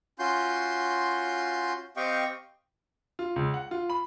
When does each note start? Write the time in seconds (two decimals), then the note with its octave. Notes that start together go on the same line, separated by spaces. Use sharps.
0.19 C#4 F4 F#4 C6 G6
1.97 C4 G4 D#5 F5 G5 C#6
3.19 F4
3.36 C#2
3.54 F#5
3.71 F4
3.90 B5